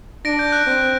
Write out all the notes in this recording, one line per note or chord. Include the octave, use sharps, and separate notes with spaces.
D4 A#6 D7
G6
F#6
C4